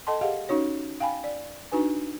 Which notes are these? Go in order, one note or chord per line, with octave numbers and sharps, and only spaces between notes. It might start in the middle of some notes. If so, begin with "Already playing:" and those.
A4 D#5 G5 A5 C6
G4 G#4 D#5 F5 F#5
C#4 D#4 F#4 C#5
F5 G5 G#5 B5
D5
D4 D#4 F#4 B4 G#5